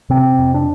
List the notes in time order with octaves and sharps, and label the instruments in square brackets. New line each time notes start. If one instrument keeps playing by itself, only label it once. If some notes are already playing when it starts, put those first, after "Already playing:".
[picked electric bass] C3 C4
F2
D4